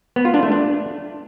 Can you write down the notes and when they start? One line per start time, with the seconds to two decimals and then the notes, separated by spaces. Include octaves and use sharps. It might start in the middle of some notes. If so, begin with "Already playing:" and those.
0.16 B3
0.25 F4
0.34 D4
0.43 A3
0.52 D4